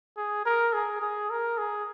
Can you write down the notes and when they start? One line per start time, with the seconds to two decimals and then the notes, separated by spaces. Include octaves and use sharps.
0.17 G#4
0.46 A#4
0.73 G#4
1.02 G#4
1.30 A#4
1.58 G#4